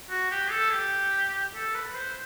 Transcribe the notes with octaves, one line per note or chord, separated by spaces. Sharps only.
F#4
G4
A4
G4
A4
B4
C5